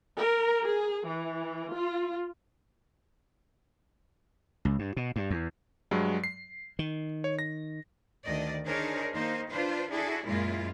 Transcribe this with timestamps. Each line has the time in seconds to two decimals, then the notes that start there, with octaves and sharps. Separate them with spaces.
0.19 A#4
0.63 G#4
1.08 E3
1.72 F4
4.65 C#2
4.79 G2
4.97 B2
5.16 G2
5.31 E2
5.91 G2 F#3 G#3
6.24 C7
6.79 D#3
7.24 C#5
7.39 A#6
8.24 D2 D#3 D5 D#5
8.65 D4 D#4 G#4 A#4 C5 C#5
9.12 D#3 A#3 D#4 C5
9.51 D4 F4 B4 C5
9.90 D4 E4 F#4 G#4 A4
10.26 F#2 A#2 G#3 A#3 E4 F4